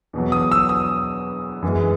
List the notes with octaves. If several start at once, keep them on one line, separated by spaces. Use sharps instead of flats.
E2 B2 F#3
D#6
E6
D#6
F#2 E3 G#3